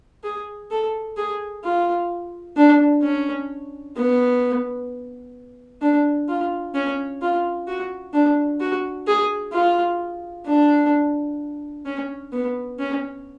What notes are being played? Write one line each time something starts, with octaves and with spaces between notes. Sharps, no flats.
G#4
A4
G#4
F4
D4
C#4
B3
D4
F4
C#4
F4
F#4
D4
F#4
G#4
F4
D4
C#4
B3
C#4